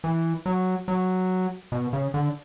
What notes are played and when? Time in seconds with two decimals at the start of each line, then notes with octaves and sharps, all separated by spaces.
0.04 E3
0.46 F#3
0.88 F#3
1.72 B2
1.93 C#3
2.14 D3